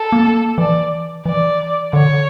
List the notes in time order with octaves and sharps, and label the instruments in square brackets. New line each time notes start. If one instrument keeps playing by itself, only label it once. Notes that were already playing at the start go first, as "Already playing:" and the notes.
Already playing: [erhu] A4
[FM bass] A#3
[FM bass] E3 [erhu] D5
[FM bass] E3 [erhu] D5
[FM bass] D3 [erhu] C#5